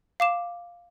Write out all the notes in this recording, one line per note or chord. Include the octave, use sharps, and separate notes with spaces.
F5 D6 E7